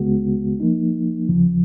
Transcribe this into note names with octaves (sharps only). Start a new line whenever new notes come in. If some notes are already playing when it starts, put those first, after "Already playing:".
Already playing: C#2 C#3 G#3 B3 F#4
F3 A#3 D#4
D#2 C#3 F3